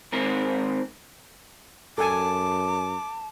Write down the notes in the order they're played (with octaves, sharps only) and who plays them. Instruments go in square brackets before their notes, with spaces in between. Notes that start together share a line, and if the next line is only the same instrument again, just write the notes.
[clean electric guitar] G#2 D#3 C4 A#4
[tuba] F#2 [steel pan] A4 G#5 [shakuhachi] A5 [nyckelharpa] D6